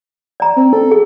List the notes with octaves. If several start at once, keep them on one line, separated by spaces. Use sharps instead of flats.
D5 A#5
C4
A4
G#4